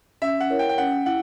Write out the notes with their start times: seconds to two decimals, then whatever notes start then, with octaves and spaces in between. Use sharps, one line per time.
0.22 C#4 E5
0.41 F#5
0.50 E4 A#4 C#5
0.59 G5
0.69 G5
0.78 C#4 F#5
1.06 E4 F#5